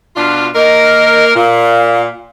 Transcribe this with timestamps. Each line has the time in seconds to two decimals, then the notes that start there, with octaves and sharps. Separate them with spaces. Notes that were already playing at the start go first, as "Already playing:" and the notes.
0.16 B2 D4 F4
0.55 A#3 A#4 D#5
1.36 A#2 F5